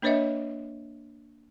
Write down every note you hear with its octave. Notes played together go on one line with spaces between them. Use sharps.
A#3 D4 B4 C#5 D#5 E5